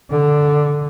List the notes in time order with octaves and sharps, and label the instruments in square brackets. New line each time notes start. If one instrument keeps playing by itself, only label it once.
[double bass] D3